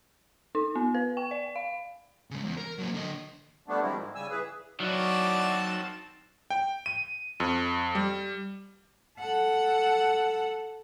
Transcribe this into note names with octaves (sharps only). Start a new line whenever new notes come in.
D#4
B3
B4
G5
D5
F5
C#3 G#3
E2
A#4
F#3 A#3
D3 D#5
D3 G3 A3 B3 D4
D#3 F3 G3 G#3 C4 E4
G#2
C#3 G3 G#5 E6
E3 G#4 B4
D#3 F#3 C4 E4 F#4 D5 A5
G5
D#7
F2
G3
A4 F#5